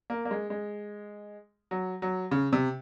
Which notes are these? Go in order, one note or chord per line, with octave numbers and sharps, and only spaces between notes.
A#3
A#3
G#3
G#3
F#3
F#3
C#3
C3